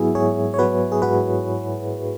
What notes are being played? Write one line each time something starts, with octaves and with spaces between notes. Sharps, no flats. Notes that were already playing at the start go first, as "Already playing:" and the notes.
Already playing: G#2 F#3 B3 E4 F#4 G#4 E5
G#2 G#4 C#5
C#5
F#3 B3 F#4 B4
G#4
G#2 F#4 B4